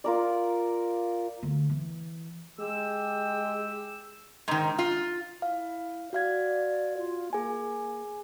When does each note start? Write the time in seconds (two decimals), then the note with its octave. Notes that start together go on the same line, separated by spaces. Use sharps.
0.04 F4 A#4 D5
1.43 D2
1.70 E3
2.59 G#3 G4 G5 E6
4.48 G#2 D#3
4.79 F4
5.42 E4 F5
6.13 F#4 D5 F5 G#6
6.97 F4
7.33 A#3 G#4 G#5